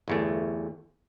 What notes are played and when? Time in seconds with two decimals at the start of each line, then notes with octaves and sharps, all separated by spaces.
0.08 G1 E2 A3